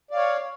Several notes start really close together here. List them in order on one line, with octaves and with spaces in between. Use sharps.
D5 F5 C#5